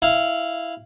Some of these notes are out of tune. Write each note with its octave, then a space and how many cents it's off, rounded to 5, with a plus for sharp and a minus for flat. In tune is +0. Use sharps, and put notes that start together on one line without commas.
E4 +0 F5 -10